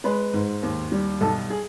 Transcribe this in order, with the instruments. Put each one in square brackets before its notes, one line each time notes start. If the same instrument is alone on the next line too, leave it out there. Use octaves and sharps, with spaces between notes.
[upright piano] G#3 B4
G#2
D#2
G3
B1 A4
G#4